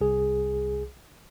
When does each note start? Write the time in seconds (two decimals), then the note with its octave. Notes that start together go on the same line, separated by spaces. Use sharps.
0.01 C2 G#4